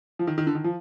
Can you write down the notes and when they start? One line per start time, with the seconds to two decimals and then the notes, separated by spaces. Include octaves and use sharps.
0.19 F3
0.27 D#3
0.38 D#3
0.47 D3
0.55 D#3
0.64 F3